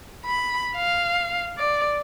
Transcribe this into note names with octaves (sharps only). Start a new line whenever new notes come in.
B5
F5
D5